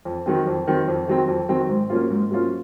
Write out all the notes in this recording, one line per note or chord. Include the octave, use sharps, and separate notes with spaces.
F2
D#3 F#3 C4
F2
D#3 F#3 C4
F2
D#3 F#3 C4
F2
D#3 F#3 C4
G#2
F#3 A#3 C#4 F4
G#2
F#3 A#3 C#4 F4